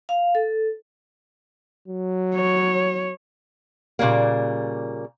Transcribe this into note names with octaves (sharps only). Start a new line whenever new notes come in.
F5
A4
F#3
C#5
A#2 C#3 G3 A#3